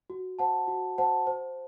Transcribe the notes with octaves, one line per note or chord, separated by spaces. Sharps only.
F#4
C5 F#5 A5
F#4
C5 F#5 A5
C5